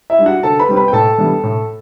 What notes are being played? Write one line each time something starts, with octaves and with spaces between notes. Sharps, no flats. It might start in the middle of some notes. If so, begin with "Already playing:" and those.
E4 E5
G3 D4
F#4 F#5
D3 A4 A5
B4 B5
G3 C4
B4 B5
G5
A2 A4 A5
E3 G3 B3 D4
A2